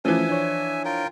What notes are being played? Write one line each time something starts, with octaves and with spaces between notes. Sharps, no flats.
E3 F3 A3 C#4 E5 G#5
D4 C#5
F4 A#4 G5